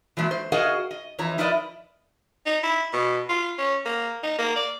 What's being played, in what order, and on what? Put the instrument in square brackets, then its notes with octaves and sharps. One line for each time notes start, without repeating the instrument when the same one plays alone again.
[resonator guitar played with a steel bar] E3 F#3 G#3 A#3
C5
F#4 G#4 A#4 D#5 F5 F#5
D#5
F2 E3 C#5 A#5
F3 E4 A#4 B4 D5 D#5
[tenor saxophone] D#4
E4
B2
F4
C#4
A#3
D#4
A#3
D5